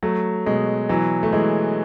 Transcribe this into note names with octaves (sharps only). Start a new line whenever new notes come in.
F#3 A3
B2 G#3
E3 F#3
A3
E3 G#3